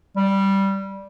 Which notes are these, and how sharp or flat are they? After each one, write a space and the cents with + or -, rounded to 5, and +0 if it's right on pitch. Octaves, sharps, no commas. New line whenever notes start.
G3 -5